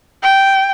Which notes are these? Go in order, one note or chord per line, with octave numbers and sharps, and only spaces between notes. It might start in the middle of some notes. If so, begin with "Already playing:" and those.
G5